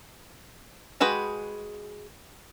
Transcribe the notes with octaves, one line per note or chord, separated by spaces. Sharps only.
G#3 F#4 G#4 B4 G5